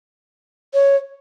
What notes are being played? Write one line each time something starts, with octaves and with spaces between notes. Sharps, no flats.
C#5